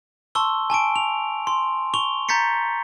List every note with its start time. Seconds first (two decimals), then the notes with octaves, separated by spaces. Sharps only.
0.35 A5 C6 C#6 E6 G7
0.70 G#5 A5 C#6 D7
0.96 F7
1.47 C6
1.94 C#6 F7 G7
2.29 A#5 G6 A6 B6 C#7